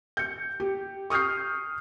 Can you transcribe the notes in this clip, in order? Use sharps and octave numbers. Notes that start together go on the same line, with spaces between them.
G6 C#7
G4
C#6 D#6 F6 G6 C7